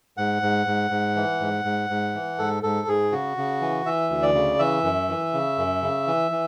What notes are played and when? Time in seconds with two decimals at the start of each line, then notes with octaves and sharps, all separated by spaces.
0.17 G#2 F#5
0.42 G#2
0.67 G#2
0.91 G#2
1.16 E3
1.40 G#2
1.65 G#2
1.90 G#2
2.15 E3
2.39 G#2 A4
2.63 G#2 A4
2.88 G#2 G#4
3.12 C#3 F#4
3.37 C#3
3.61 E3
3.86 E3 E5
4.10 D2
4.22 D5
4.35 C#3
4.59 E3 E5
4.84 F#2
5.09 E3
5.34 C#3
5.58 F#2
5.82 C#3
6.07 E3
6.31 E3